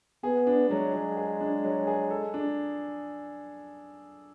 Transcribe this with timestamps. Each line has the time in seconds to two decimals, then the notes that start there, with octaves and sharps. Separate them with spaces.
0.23 B3 G#4
0.47 D4
0.70 F#3 G#3
0.94 F#3
1.17 G#4
1.40 D4
1.64 F#3
1.87 G#4
2.10 A4
2.34 D4